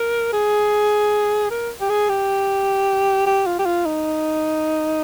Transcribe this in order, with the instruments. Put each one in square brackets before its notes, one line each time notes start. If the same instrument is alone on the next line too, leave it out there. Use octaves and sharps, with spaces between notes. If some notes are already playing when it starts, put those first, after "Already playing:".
Already playing: [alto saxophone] A#4
G#4
A#4
G4
G#4
G4
G4
F4
G4
F4
D#4